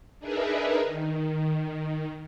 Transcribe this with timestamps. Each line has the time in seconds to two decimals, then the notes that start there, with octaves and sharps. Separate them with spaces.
0.19 D4 D#4 G#4 A#4 B4 E5
0.81 D#3